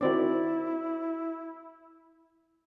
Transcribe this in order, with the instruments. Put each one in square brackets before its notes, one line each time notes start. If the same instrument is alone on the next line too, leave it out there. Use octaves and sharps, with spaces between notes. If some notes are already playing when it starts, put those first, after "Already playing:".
[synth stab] D#3 C4 D4 [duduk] E4 [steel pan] F#4 D5